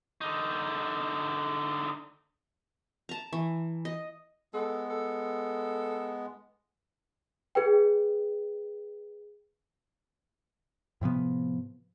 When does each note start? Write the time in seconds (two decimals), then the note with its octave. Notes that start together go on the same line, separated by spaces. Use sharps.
0.21 D3 D#4
3.09 A5 A#5
3.33 E3
3.85 D#5
4.54 G#3 B3 A4
4.90 A4
7.55 G#4 B4 G5
11.01 A2 C3 F3 B3